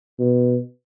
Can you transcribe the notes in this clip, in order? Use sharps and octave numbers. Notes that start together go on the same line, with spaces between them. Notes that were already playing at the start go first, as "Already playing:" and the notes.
B2